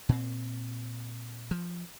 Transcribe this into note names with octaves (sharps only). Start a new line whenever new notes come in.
A#2 C4
F3